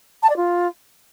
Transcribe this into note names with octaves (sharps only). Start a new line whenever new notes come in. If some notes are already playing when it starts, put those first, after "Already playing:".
A5
D5
F4